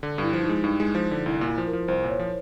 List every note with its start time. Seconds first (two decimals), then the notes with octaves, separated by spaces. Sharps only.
0.03 D3
0.18 G2 E4
0.33 F3
0.43 D#4
0.49 G#3
0.64 G2 D#4
0.80 G#3
0.95 F3
1.11 D3
1.26 C2 E4
1.41 A#2
1.47 F4
1.58 F3
1.67 A#4
1.73 F3
1.88 C2 C5
2.04 A#2
2.09 C#5
2.19 F3